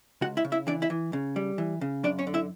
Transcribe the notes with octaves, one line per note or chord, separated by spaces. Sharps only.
C#2 F#4 F#5
E4 E5
C#3
E4 E5
E3 D4 D5
E4 E5
E3
C#3
G3
E3
C#3
F#2 D4 D5
C#4 C#5
D3
E4 E5